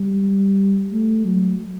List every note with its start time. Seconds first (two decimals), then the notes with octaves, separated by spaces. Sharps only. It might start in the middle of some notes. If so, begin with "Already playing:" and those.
Already playing: G3
0.92 A3
1.25 F#3